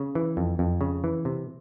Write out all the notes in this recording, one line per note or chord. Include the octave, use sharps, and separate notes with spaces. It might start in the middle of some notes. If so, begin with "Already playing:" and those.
Already playing: C#3
E3
F2
F2
C#3
E3
C3